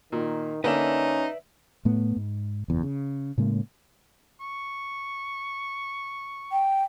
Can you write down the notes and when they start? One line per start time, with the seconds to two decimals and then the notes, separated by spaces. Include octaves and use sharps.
0.12 A#2 D#3
0.64 D3 A#3 C#4 D#4 B4 D5 E5
1.85 A2 A3 B3
2.16 G#2
2.68 F#1 E2
2.83 C#3
3.38 A2 C#3 G#3 A#3
4.40 C#6
6.52 G5